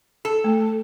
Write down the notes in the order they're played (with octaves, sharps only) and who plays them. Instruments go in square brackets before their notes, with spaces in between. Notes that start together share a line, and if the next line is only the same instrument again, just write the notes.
[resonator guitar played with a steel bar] A4
[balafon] A3